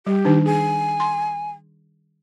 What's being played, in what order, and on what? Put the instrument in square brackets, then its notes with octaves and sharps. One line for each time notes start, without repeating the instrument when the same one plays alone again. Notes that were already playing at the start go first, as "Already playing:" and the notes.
[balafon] G3 [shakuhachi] G4
[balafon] D#3 D4 D#4
[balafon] G#4 [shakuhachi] G#5
[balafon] C6